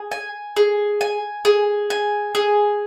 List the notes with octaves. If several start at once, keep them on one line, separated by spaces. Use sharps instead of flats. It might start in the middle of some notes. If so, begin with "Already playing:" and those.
Already playing: G#4
G#5
G#4
G#5
G#4
G#5
G#4